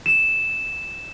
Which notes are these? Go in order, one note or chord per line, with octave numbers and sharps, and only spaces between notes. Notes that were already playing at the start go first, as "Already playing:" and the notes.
E7